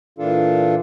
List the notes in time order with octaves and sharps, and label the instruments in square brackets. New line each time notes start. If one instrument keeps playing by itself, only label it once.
[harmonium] A#2 E3 D4 F4 A4